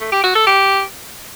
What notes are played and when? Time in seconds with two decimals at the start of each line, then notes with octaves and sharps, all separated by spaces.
0.01 A3
0.12 G4
0.24 F#4
0.35 A4
0.47 G4